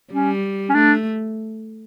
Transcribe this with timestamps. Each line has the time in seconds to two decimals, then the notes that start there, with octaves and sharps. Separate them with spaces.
0.12 G3 C#4
0.70 C#4
0.74 A3 D4